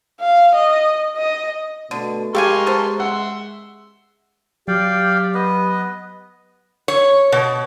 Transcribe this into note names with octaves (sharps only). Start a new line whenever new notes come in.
F5
D#5
D#5
B2 D3 A3
G#3 G4 A4 A#4 F5 G#5 C6 C#6
B3 A4 C5
E5 F#5 C6
F#3 G4 D5 F5 G5
B3 B4 D#5
C#5
B2